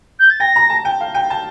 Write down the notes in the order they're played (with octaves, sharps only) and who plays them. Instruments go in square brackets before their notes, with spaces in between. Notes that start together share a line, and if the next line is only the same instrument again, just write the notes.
[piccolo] G6
A6
[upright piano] G5 [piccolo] A#6
[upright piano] A#5
A5
G5
F5
G5
A5